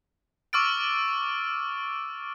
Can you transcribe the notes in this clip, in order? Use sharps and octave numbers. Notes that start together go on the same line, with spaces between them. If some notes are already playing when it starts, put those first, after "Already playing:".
C#6 D6 E6 F6 A6 D7